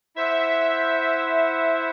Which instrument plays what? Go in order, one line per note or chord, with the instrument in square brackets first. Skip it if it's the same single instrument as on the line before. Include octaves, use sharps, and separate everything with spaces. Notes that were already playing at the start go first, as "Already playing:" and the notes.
[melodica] E4 C5 F#5 [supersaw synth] E5